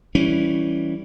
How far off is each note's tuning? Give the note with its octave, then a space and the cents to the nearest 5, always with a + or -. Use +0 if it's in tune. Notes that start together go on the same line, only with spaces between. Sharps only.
E3 +0 G3 +0 C#4 +0